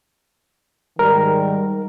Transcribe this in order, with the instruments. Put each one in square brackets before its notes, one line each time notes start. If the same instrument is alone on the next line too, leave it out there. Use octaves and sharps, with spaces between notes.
[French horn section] G#2 D#3 G3 [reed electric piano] A#4